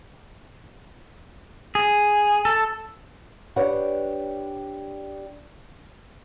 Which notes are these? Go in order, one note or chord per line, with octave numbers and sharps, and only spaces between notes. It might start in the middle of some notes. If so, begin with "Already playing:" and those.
G#4
A4
D4 G4 B4 C#5 F#5